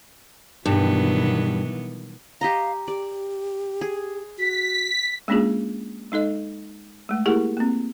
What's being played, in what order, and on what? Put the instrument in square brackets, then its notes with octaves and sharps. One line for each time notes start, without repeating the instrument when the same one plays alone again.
[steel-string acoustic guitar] G2 [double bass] B2 E3 [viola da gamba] D#3 F#3 B3
[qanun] G4 D#5 A#5 [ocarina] F5
[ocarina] G4 [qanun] D5
[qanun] G#4
[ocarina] F#4 [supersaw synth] B6
[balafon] G#3 A#3 C#4 D4 F4 G#4
G#3 D#4 A4 D#5
G#3 A3
A#3 E4 G4 G#4 A#4 F#5
A#3 C4